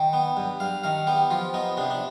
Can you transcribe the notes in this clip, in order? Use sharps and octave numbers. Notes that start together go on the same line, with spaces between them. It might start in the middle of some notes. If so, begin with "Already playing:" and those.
Already playing: D#3 G5
B3
G2
G2 F5
D#3 F5
B3 G4
F3 F4
B3 D#4
C3 D4
D4